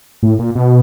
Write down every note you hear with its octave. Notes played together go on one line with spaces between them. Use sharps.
A2
A#2
B2